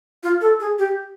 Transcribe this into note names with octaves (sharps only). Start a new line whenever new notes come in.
F4
A4
G#4
G4